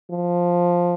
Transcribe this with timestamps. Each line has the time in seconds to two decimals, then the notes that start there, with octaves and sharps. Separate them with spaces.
0.11 F3